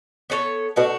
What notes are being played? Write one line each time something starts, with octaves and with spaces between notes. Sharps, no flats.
B3 D4 A4 C#5
B2 A3 D4 F#4